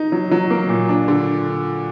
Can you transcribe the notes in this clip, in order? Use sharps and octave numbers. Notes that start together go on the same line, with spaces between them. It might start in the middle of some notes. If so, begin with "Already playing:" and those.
Already playing: D#4
F#3
F#3
A#3
A#2
D4
D3